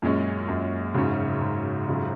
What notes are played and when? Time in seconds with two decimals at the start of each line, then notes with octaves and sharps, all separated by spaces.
0.02 F#2 A#2 G#3 C#4
0.48 F#2
0.94 G#2 C#3 F#3 C#4
1.41 G#2
1.87 F2 C#3 F#3